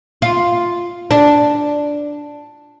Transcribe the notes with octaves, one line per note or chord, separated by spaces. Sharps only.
F4
D4